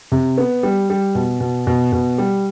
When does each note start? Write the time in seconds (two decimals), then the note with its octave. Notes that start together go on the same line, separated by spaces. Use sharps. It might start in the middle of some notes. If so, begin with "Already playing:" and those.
0.12 C3
0.38 B3
0.63 G3
0.90 G3
1.15 B2
1.40 B2
1.67 B2
1.93 B2
2.18 G3